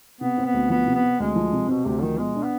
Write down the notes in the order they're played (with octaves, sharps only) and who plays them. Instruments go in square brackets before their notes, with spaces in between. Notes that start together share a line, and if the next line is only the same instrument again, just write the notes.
[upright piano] C3 [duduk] B3
[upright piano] C4
[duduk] B3
[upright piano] D2
[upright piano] F3 [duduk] B3
[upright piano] C3
[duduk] B3
[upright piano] C4
[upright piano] D2 [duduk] G#3
[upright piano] F3
C3
[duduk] B2 [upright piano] C4
[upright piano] D2 [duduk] C3
[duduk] D#3 [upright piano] F3
[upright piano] B2 [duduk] G#3
[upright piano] D4
[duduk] B3